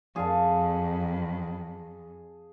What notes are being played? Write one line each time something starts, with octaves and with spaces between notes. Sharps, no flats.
F2 G#4 F5 A5